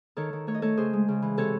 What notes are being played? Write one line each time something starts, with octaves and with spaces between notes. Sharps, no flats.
D#3 A4 C#5
D#3
A3 C#5
D#5
A3 A4 C#5
C#3 G#4 C5
G#3
C#3
E3
C3 A4 C#5